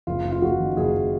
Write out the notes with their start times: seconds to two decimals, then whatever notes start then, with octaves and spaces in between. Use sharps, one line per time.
0.07 F#1 F4
0.25 F#1
0.32 F4
0.42 F#1 F#4
0.60 D#3
0.76 F#1 G#4
0.94 F#1